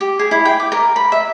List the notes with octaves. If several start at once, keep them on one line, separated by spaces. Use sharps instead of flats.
G4
G#4
E4
G5
D6
A#4
B5
E5